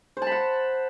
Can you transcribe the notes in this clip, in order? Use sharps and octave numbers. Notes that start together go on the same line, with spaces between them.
C5 F#5 A5 B5